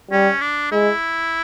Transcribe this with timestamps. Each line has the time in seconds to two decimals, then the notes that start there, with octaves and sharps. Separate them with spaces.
0.10 G3 C#4
0.41 D4
0.72 G#3 E4